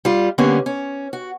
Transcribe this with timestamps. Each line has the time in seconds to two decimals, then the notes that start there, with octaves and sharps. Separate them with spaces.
0.05 G3 F4
0.38 D3 G3 A#3 B3 C#4 D4
0.66 C#4
1.13 F#4